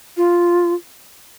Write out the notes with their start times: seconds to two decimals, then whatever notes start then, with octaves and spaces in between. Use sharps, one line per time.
0.17 F4